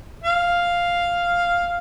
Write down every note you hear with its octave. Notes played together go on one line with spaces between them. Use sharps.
F5